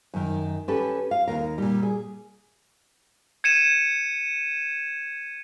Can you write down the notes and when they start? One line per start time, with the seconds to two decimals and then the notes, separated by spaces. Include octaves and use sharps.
0.14 F#2 D#3
0.68 C#4 G4 A4 B4
1.11 F5
1.27 D#2 A#4
1.58 A#2 G3
1.83 G#4
3.44 G#6 C#7 D#7 E7